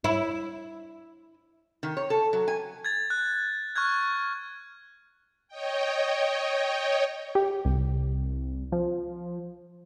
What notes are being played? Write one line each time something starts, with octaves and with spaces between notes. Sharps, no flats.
E4
D#3
C#5
A4
F#3
G#5
G#6 A6
F#6
C#6 F6 F#6 G#6
C#5 D#5 G5
G4
C2
F3